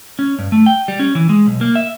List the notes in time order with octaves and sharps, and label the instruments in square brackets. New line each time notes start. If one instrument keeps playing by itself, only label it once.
[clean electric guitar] C#4
G2
A3
G5
G3
C#4
E3
G#3
B1
A#3
E5